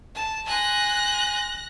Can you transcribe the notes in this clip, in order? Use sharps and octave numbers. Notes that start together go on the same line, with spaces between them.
A5
G#5 C6 F#6 A#6